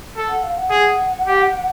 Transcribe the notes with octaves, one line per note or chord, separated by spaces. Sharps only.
A4
F#5
F5
F#5
G#4
G4